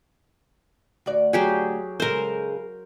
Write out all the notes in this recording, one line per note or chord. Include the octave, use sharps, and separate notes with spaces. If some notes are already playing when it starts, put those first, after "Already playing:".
D2 F#4 D5
F#3 G4 G#4
C#3 G#3 A4 A#4 C5